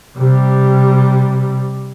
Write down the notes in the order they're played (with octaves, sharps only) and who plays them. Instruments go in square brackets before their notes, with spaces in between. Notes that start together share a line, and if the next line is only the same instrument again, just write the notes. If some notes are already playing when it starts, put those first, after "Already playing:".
[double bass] C3 G3